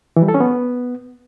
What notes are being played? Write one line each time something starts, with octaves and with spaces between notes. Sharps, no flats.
E3
G3
A4
C#4
B3